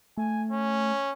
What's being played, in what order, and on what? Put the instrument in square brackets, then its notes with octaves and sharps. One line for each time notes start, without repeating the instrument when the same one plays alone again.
[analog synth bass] A3 [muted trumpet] G#5
[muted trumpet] C#4